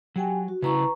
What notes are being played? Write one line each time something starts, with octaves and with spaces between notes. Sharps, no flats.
F#3 G4 G5 G#5
F#4
C#3 E4 B4 A#5 C#6